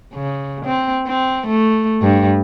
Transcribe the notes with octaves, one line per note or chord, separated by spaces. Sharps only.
C#3
C4
C4
A3
G2